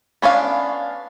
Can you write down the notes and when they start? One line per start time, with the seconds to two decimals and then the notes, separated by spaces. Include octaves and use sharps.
0.22 B3 C#4 D4 F5